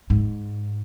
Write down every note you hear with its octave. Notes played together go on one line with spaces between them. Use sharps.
G#2